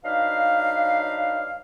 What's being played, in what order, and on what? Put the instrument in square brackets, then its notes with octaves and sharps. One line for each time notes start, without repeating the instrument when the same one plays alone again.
[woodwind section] F#3 D4 D#4 B4 D#5 F5